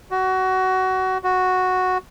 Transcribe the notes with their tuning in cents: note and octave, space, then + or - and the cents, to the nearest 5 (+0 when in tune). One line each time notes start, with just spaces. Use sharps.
F#4 +20
F#4 -5